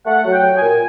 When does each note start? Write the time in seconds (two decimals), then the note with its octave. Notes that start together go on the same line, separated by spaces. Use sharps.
0.06 A3 F#5
0.25 F#3
0.32 G5
0.44 F#3
0.55 G#5
0.62 A#2